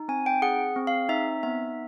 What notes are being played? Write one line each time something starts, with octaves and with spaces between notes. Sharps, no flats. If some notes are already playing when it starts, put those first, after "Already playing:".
Already playing: D#4
C4 G#5
G5
G#4 F#5
C4
F5
D#4 E5
B3 E5